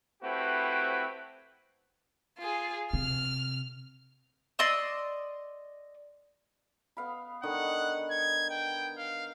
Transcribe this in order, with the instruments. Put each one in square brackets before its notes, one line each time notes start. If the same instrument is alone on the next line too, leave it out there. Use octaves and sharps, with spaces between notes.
[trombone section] A3 C4 E4 F#4 G4 B4
[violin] F4 G#4
[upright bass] C3 [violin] F6
[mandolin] D5 D#5 C6 E6
[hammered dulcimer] B3 F5 B5
[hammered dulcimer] D3 D#3 D#5 [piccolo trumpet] F#5
[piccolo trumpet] G#6
G5
F5